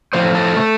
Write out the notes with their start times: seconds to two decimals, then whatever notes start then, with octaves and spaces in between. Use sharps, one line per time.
0.13 A2 F3 C4 C5
0.35 A4
0.57 C3 A3